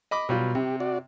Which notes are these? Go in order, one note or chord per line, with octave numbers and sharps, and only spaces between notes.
D#5 B5 D6
B2 F#3 G3 F4
C3 G4
F#4 D5